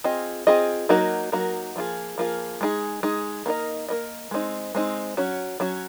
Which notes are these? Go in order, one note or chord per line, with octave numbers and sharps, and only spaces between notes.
C4 F4 G#4 D#5
C4 F4 G#4 D#5
F#3 A#3 D#4 F#4 A#4
F#3 A#3 D#4 F#4 A#4
F3 A#3 F4 G#4
F3 A#3 F4 G#4
G#3 D#4 G#4
G#3 D#4 G#4
A#3 D#4 A#4 D#5
A#3 D#4 A#4 D#5
G#3 C4 D#4
G#3 C4 D#4
F#3 C#4 F#4
F#3 C#4 F#4